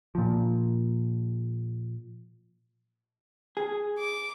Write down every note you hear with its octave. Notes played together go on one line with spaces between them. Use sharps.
A#2 F3
G#4
D6